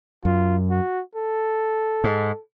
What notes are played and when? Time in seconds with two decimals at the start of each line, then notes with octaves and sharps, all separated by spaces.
0.25 F#2 F4
0.70 F#4
1.15 A4
2.04 G#2